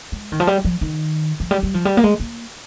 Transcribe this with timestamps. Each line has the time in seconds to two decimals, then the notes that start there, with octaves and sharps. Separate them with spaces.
0.12 G#3
0.32 D#3
0.40 F3
0.47 G3
0.65 F3
0.81 D#3
1.40 F3
1.51 G3
1.63 G3
1.74 F3
1.85 G3
1.97 A#3
2.04 G#3
2.20 A#3